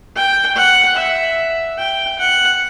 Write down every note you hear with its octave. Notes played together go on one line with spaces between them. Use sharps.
G5
F#5
E5
G5
F#5